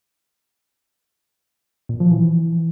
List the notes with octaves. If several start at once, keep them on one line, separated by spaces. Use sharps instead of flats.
A#2
F3
E3